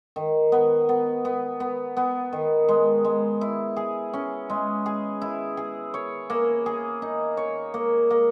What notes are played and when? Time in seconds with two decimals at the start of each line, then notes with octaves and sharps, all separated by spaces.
0.16 D#3
0.52 B3
0.89 B3
1.25 B3
1.60 B3
1.97 B3
2.33 D#3
2.69 G#3
3.05 G#3
3.41 E4
3.76 G#4
4.13 C#4
4.50 G#3
4.86 G#4
5.22 E4
5.57 G#4
5.94 C#5
6.30 A#3
6.66 G#4
7.02 D#4
7.37 C#5
7.74 A#3
8.11 A#3